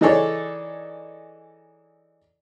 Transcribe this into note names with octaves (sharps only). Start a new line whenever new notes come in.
E3 D#4 G#4 A4 C#5 D5